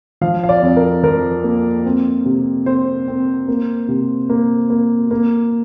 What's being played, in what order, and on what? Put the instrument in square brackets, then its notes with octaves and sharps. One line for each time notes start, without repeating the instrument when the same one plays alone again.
[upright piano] F3 F5
F5
D5
F2
A#4
F3 A#4
A#3
C4
C3
C4 C5
C4
A#3
C3
A#3
A#3
A#3